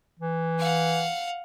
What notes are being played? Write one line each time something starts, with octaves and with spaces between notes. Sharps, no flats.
E3
F5 F#5